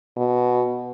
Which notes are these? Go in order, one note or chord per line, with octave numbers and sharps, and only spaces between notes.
B2